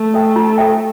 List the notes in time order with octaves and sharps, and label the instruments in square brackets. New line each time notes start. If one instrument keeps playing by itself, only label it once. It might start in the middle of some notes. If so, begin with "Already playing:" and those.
Already playing: [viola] A3
[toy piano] A4 E5 G5
F4
A4 E5 G5